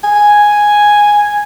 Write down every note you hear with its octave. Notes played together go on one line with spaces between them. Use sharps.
G#5